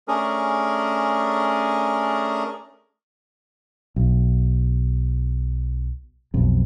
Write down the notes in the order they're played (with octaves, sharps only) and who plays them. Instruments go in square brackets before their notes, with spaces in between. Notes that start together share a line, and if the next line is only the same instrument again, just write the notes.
[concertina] A3 C#4 D4 G#4 A#4
[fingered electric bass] B1
B1 F2